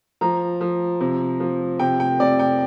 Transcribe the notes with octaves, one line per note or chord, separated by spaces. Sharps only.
F3 A#5
F3
C3
F3
C3 G5
G5
C3 D5
G5